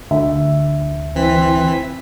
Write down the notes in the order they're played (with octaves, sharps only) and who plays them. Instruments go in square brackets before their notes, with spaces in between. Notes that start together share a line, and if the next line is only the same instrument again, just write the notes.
[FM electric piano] D2 [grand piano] E5
[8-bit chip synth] E3 B6 [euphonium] C4